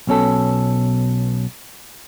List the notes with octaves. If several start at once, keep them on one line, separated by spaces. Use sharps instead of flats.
B1 B2 C#4 A4